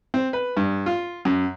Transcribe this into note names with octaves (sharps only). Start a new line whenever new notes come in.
C4
B4
G2
F4
F#2